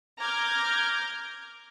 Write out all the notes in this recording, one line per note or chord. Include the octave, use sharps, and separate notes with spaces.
A#5 D6 F6 G6 G#6